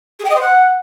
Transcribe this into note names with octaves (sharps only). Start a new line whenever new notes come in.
G#4
G5
D#5
C5
F#5